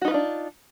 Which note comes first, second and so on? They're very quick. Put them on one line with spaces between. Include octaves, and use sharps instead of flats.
F#4 D#4 B4 F4 D4